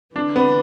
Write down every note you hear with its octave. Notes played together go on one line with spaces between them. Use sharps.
D3 E3 D4
B3